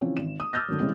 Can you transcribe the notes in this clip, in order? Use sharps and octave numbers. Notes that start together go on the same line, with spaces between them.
C#3 E3 F3 C4 C#4
G#1 E7
D#6
D6 E6 F6 G6 A6 A#6
D3 D#3 F#3
C#3 E3 G3 G#3 C4